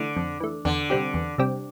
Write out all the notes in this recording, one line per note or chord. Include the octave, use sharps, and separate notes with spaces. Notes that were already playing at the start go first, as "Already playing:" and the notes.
Already playing: D3 E3 A3
F2
E3 A3
E2 D3
C3 G3 C4 G4
E2
C3 G3 C4 G4